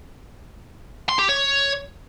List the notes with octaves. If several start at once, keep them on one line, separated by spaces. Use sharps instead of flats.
C6
G4
C#5